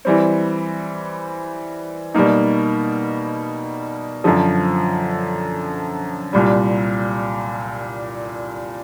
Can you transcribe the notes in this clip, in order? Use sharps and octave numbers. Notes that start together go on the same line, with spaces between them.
E3 G3 C4
B2 G3 A#3 D#4
F#2 D3 F3
C2 A#2 G3